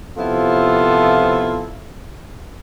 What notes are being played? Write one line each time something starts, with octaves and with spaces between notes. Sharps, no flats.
C3 F3 B3 E4 F4 A4